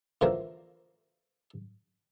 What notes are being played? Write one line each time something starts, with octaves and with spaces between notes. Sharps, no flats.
D3 E3 F3 A#3 A#4